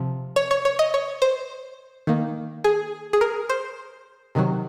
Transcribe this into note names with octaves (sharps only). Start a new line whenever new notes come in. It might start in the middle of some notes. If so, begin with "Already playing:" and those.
Already playing: C3 F3
C#5
C#5
C#5
D#5
C#5
C5
D#3 A#3
G#4
G#4
A#4
C5
C3 D#3 F#3